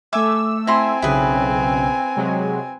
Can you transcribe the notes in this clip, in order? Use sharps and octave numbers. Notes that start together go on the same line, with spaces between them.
A3 E5 G#5 D6 E6
C4 E4 G#5 A#5 C6
B1 C#3 E4 G#4 B4
C3 F#3 G#3